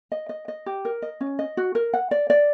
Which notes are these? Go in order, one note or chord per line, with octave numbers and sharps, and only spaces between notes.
D#5
D#5
D#5
G4
A#4
D#5
C#4
D#5
F#4
A#4
F#5
D5
D5